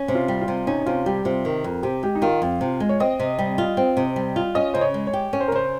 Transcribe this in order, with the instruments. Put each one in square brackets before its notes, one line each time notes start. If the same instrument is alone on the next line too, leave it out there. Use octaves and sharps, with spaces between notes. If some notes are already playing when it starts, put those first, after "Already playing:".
Already playing: [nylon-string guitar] C#4
C3
[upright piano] F4
[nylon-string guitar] G3
[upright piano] F4
[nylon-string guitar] C3
[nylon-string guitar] C#4 [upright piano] D#4
[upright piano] D#4
[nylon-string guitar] C3 [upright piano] F4
[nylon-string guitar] G3 [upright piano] G4
[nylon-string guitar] C3 [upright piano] F4
[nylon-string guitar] D#3
[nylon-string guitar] F2 [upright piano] A#4
[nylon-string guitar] C3 [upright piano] G4
[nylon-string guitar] G#3 [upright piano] G4
[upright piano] D#4
[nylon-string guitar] D#3 [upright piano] F4
[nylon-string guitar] F2
C3
G#3
[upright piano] C#5
[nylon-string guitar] C4 [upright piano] D#5
[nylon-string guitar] C3
G3
F4
C4
C3
G3
F4
[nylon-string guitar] C#4 [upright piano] D#5
[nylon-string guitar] C#3 [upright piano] C5
[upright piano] C#5
[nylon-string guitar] G#3
[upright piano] C#5
[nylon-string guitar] G4
[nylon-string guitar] C#4 [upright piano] C#5
[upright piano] C5
A#4
[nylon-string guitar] C#3 [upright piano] C5